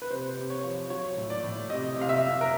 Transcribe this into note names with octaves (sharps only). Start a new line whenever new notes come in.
B4
C3 C5
C3
C#5
F3
F#3 C#5
A2
D5
A2
C3 D#5
C3
F5
E5
C3
A#4